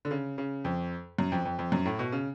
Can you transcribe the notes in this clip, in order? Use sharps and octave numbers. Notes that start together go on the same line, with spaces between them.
D3
C#3
C#3
F2
F#2
F2
F2
F2
F#2
A2
B2
C#3